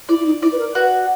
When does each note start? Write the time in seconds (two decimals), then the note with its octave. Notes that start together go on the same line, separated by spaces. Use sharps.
0.09 E4 D5
0.19 E4
0.26 D#4
0.42 E4 D5
0.52 B4
0.59 A#4
0.75 F#4 B4